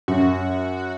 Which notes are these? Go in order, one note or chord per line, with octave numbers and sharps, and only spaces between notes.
F#2 F#4